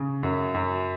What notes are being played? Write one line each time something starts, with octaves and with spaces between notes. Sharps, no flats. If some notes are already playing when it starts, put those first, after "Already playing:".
Already playing: C#3
F#2
F#2